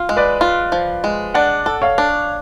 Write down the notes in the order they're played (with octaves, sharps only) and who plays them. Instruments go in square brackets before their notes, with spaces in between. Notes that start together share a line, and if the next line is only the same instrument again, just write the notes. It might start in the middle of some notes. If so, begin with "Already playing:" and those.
Already playing: [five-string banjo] F4
G#3
[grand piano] B4 D5
[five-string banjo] F4
F3
G#3
[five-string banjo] D4 [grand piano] D5 F#5
[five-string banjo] A4
[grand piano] C#5 F5
[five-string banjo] D4